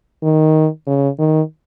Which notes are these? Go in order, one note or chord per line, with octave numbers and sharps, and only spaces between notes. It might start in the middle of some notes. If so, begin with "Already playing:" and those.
D#3
C#3
D#3